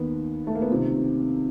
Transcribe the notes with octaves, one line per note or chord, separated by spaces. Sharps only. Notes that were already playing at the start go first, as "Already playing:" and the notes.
Already playing: D#2 D#3 B3
A3
A#3
B3
C#2 C3 D#3 C4